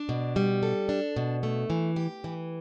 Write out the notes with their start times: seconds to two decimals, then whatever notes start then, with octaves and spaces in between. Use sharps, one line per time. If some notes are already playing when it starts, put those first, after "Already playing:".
Already playing: D4
0.09 B2
0.36 G3
0.63 A4
0.89 D4
1.16 B2
1.43 A3
1.70 E3
1.96 G4
2.24 E3